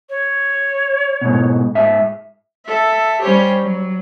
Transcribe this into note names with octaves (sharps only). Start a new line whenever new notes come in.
C#5
G#2 B2
G#2 E5
A4 E5
G3 C#4 G4 C5 C#5
F#3